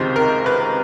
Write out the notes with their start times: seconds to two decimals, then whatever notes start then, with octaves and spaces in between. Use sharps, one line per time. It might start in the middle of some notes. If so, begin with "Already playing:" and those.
Already playing: C#2 C3 D#3 C5
0.16 A#4
0.46 B4